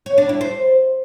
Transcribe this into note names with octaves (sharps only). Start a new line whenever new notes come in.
C#5
D4
E4
C5